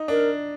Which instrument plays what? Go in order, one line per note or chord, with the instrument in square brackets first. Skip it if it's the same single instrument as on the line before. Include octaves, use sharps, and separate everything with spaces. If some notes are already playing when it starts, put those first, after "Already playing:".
Already playing: [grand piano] D#4
[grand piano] D4 [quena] A#4